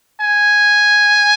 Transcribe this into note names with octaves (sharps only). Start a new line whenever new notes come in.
G#5